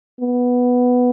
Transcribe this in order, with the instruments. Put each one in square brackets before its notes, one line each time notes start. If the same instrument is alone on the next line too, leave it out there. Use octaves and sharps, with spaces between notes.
[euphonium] B3